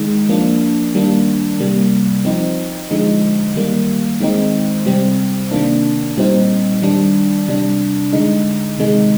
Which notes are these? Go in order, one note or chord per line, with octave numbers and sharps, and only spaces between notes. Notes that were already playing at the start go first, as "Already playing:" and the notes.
Already playing: D#3 G#3 D#4
F3 A#3 D4
D#3 G3 A#3 D4
C3 G3 A#3
F3 C4 D#4
D3 F3 G#3 D#4
D#3 G3 A#3
D#3 G#3 C4 D#4
C3 G3 C4
C3 D#3 A#3 D4
A#2 G3 C4 D#4
D#3 G3 D4
C3 G3 D4
D3 G#3 D#4
C3 D#3 G#3 D#4